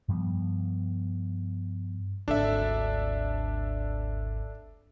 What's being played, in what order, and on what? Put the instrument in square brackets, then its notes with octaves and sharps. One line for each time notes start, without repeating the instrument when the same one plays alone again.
[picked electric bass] G2 F3 G3 B3
[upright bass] G#1 D2 [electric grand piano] D4 A4 E5